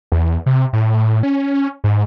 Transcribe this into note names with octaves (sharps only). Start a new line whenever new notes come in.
E2
C3
A2
C#4
G#2